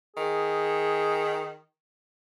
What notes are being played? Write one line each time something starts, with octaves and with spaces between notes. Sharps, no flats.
D#3 G#4